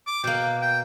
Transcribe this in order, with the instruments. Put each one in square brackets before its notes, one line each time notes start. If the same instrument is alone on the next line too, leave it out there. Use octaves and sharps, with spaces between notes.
[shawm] D6
[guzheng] B2 A#3 [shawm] G5
[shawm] G5